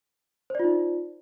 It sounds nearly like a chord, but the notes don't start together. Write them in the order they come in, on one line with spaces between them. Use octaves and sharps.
C5 D5 F4 D#4